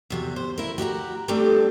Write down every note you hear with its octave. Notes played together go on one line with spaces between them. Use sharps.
E2 C3 F#4
C5
E4 A#4
F#4 G4 D#5 A#5
G3 A3 C4 D4 G4 A4